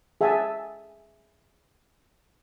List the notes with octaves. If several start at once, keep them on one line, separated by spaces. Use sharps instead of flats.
G#4 E5 F#5 G#5 A5